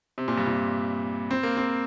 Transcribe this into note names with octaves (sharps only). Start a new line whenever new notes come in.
C3
A#2
G2
A#2
C4
A#3
C4